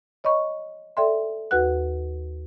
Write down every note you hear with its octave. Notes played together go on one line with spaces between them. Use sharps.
C#5 D#5 B5 C#6
A4 D5 E5 G5 C6
D#2 F#4 B4 F#5 F#6